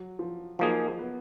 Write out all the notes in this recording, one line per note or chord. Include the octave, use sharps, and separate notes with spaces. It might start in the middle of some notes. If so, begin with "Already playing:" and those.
Already playing: F#3
F3
F3 F#3 A#3 D#4 G#4
B3